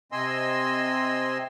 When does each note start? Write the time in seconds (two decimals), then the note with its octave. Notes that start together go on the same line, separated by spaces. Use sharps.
0.12 C3 C4 D#5 G#5 C6 E6